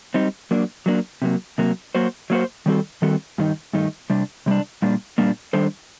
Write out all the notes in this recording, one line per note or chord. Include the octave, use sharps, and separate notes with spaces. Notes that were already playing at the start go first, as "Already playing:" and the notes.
G3 C4 D#4
F#3 A#3 D4
F#3 A#3 D4
C3 F#3 A#3
C3 F#3 A#3
F#3 A#3 F#4 C5
F#3 A#3 F#4 C5
D#3 G3 C4 F#4 A4
D#3 G3 C4 F#4 A4
G2 D#3 A3 D#4
G2 D#3 A3 D#4
C3 G3 D4
C3 G3 D4
A#2 G3 A#3 D4
A#2 G3 A#3 D4
D#3 G3 D4 A4 C5